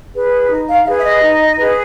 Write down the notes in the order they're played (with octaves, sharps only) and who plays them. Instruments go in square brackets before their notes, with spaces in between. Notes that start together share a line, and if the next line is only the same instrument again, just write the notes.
[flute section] G#4 B4
D#4
F5
G#4 E5
B4
E5
D#5
D#4
G#4 B4